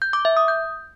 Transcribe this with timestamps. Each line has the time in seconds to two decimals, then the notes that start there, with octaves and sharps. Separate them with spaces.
0.02 G6
0.13 D6
0.25 E5
0.37 D#6
0.48 G6